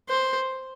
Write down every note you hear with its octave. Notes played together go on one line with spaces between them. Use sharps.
C5